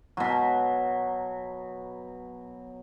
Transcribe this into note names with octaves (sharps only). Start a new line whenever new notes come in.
B2 F#3